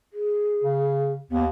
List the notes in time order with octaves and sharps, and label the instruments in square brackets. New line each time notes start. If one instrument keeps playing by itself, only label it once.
[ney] G#4
[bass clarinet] C#3
[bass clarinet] D#2 [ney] B3